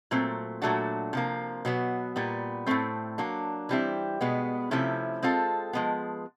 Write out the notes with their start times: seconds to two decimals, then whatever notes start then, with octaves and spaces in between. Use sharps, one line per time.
0.11 A#2 F#3 A3 C4
0.62 A#2 F#3 A3 D4 F#4
1.13 C3 F3 A#3
1.65 B2 F#3 B3
2.16 A#2 G3 B3
2.66 A2 F3 A3 C4
3.18 F#3 A#3 D4
3.69 E3 G3 C4 E4
4.21 B2 G#3 B3
4.71 C3 F3 A3 C#4 E4
5.23 G#3 C4 F4 A4
5.73 F3 G#3 B3